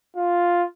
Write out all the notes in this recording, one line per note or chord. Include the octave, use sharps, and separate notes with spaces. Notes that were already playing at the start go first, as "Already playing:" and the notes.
F4